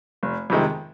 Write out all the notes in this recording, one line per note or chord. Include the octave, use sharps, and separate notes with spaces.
F1
F2 C3 D#3 G#3